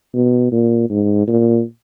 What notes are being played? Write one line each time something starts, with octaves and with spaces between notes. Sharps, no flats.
B2
A#2
G#2
A#2